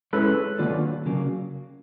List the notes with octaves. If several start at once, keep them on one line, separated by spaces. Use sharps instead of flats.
G#3 C#4 E4 A4 B4
D#3 F#3 A#3 D4 F4
C#3 F#3 A#3